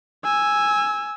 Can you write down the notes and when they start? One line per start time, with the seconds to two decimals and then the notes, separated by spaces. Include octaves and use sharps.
0.24 G#5 E6